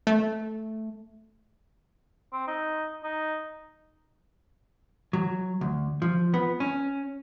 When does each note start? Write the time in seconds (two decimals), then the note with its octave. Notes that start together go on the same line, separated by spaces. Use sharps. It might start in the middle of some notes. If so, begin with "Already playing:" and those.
0.07 A3
2.33 C4
2.47 D#4
3.04 D#4
5.13 F#3
5.61 D2
6.02 F3
6.34 B3
6.60 C#4